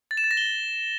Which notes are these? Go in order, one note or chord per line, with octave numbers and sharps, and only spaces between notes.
A6
E7
A6
A#6
G7